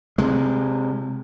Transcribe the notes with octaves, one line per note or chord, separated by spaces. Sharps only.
C3 G#3